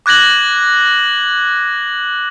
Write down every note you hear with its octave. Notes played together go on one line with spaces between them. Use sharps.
D6 F#6 G#6 A#6 F#7